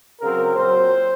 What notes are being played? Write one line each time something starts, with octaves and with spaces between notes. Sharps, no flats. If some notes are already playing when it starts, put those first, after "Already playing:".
C#3 F#3 C4 A#4
A#2 F#3 C4 C5